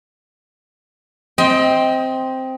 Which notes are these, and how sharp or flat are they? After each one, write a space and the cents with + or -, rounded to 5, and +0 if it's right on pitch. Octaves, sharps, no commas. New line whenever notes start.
C4 +0 D#5 +25 G5 +0